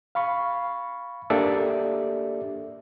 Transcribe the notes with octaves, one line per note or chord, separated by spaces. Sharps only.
F5 B5 C#6
A#3 D4 G4 A4 D5 E5